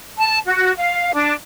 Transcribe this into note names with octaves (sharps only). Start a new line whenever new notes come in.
A5
F#4
F5
D4